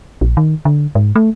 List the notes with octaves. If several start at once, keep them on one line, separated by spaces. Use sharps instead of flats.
A#1
D#3
D3
G#2
A3